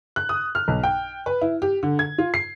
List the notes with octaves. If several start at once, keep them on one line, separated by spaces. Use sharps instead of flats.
F#6
D#6
F6
B1
G5
B4
E4
G4
D3
G#6
F4
C7